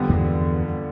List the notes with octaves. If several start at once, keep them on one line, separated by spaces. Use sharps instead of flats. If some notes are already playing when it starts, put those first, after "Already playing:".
Already playing: F2 D3 G3 B3
E2 G2